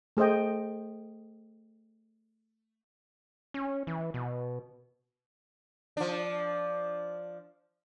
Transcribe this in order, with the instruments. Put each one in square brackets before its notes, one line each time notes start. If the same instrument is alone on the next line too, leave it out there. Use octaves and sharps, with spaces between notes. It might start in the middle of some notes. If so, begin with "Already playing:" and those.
[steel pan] A3 G#4 C5 D#5 G5
[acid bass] C#4
E3
B2
[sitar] F3 D4